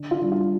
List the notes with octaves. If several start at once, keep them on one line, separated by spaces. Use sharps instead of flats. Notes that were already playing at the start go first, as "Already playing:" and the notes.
Already playing: D3
F4
G3 D4
F4